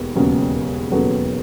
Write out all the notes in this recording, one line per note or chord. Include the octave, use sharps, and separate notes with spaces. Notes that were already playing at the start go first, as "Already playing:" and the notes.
Already playing: E1 D#2 B3
E1 D#2 C#3 F#3 B3
E1 D#2 C#3 F#3 B3 A4